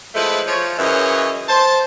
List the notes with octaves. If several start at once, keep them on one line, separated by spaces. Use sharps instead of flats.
F3 G#3 A3 E4 B4
F3 C#5
F#2 C#3 E3 C#5 D#5
C5 A5